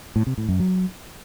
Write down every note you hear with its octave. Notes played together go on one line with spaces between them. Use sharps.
A2
C3
A2
F#2
F#3